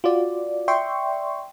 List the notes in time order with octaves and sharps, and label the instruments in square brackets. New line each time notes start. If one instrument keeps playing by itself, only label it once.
[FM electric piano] F4 F#4 D5
D5 E5 G5 C6 C#6